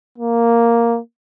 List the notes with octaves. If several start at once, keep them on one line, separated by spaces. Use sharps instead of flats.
A#3